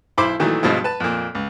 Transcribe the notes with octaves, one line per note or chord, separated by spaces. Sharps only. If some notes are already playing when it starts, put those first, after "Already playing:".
B1 E4 C5 B5 C6 D6
A#2 D#3 E3 F#3 A3
G2 B2 F3 G#3
B4 A5
F2 A#2
C#2